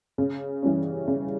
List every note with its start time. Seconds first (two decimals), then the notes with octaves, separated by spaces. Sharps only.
0.18 C#3
0.63 E3 G3 C#4
1.07 C#3